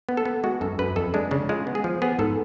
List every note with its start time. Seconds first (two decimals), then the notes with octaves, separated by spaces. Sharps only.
0.09 B3
0.17 A4
0.25 B3
0.44 G#3 F#4
0.61 F#2 A4
0.79 F#2 B4
0.96 F2 A4
1.14 G#3 D4
1.31 C#3 D4
1.49 G#3 F4
1.67 B3
1.75 G#4
1.84 F3
2.02 B3 G#4
2.19 G#2 A4